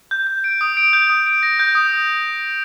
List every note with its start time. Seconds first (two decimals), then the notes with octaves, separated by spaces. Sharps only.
0.11 G6
0.27 G6
0.44 D7
0.61 D#6
0.77 D7
0.93 G6
1.10 D#6
1.26 D7
1.43 A#6
1.59 G6
1.75 D#6